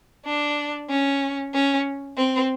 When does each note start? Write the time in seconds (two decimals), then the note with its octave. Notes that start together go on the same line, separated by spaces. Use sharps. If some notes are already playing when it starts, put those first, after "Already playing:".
0.26 D4
0.90 C#4
1.54 C#4
2.17 C4